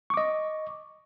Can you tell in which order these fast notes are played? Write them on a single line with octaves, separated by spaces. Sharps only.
C#6 D6 D#5